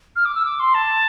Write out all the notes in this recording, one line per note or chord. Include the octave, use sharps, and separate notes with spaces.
F6
D6
E6
D6
C6
A5